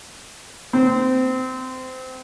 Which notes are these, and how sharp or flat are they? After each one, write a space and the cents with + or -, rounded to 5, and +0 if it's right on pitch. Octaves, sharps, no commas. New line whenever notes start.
C4 -20